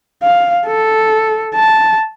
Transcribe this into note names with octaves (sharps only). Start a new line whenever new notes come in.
F5
A4
A5